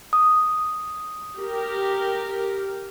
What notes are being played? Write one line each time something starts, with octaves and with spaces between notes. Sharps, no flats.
D#6
G4 A#4